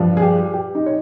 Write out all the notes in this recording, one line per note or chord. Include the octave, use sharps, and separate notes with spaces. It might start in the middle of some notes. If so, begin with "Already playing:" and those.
Already playing: G2 F3
G#4
G4
G4
D#4
C#5